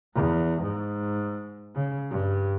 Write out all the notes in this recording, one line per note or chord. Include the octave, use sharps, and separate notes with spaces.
E2
G#2
C#3
G2